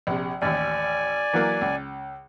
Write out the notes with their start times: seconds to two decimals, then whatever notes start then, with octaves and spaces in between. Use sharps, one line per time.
0.07 A#1 C3
0.42 A1 D#2 D5 G#5
1.33 E3 F#3 A#3
1.61 C#2